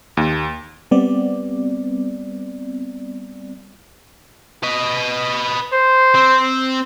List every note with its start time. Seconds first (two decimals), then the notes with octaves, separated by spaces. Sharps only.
0.17 D#2
0.91 G3 B3 C4 D5
4.63 B4 D#5
5.73 C5
6.15 C4